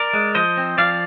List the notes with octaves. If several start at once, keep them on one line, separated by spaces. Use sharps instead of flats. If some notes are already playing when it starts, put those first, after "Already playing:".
Already playing: A#4 D5
G#3
F3 C5 D#5
C4
F3 D5 F5